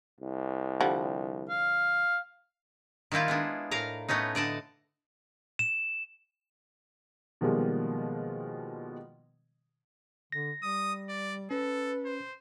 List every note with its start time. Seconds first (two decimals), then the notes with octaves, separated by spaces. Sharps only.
0.21 C2
0.80 D3 F3 G3
1.49 F5
3.12 D#3 G3 A#3 E4 F4
3.28 G#3 B3 D4
3.71 A2 A#4 F5 A#5
4.08 A2 A3 B3 C#4 D#4
4.35 D3 D5 D#5 A5
5.59 E7
7.41 B2 D#3 F3 G3 G#3 A#3
10.32 D3 A#6
10.63 G3 D#6
11.08 D5
11.51 C#4 A4 B4
12.05 C5